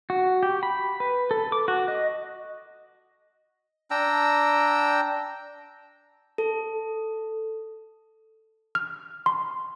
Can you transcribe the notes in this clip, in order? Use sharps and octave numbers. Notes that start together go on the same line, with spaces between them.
F#4
G4
B5
B4
A4
D6
F#4
D#5
D4 G5 A#5 E6
A4
F6
C6